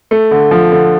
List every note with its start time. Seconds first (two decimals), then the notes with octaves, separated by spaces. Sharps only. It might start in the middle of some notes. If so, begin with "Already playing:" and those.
0.11 A3
0.31 D3
0.51 F3
0.72 D3